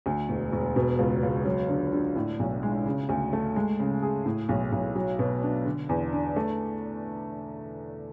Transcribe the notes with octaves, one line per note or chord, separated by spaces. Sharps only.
D2
E1
E1
B2
C#2
C#2
F#3
D3
D3
A2
B1
G#3
C#3
D2
A3
G#3
C#3
G#4
A2
B1
B1
F#3
B2
D4
D3
E2
D4
A3